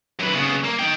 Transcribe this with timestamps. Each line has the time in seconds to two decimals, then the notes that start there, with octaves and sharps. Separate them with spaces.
0.19 F#2 B4
0.33 C#3 B3
0.64 A#3
0.79 D#4 G5